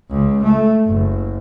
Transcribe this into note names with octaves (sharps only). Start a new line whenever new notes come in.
C#2
A3
F#1